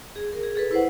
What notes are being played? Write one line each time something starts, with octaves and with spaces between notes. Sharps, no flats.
G#4
G#4 A#4
G#4
G#4 A4 B4
E4 B4 C5 F#5